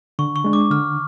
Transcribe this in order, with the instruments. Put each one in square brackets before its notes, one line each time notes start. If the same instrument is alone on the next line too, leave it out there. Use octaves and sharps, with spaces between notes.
[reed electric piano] D3 [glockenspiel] C#6
[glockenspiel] C#6
[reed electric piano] G#3 D4
[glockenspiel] D6
[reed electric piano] D3 [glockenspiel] F6